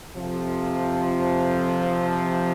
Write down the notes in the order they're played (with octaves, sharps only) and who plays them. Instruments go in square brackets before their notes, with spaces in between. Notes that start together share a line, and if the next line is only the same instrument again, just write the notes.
[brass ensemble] F2 C3 F3